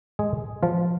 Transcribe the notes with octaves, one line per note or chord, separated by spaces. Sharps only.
G#3 G#4
F3 F4